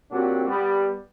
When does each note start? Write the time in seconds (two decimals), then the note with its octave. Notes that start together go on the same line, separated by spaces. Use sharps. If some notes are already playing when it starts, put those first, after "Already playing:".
0.11 A#2 F#3 C4 D4 F#4 G4
0.47 G3 B3